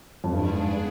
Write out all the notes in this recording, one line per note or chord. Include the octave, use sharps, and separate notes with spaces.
F2
G2 B3 D4 G#4 D5
G#2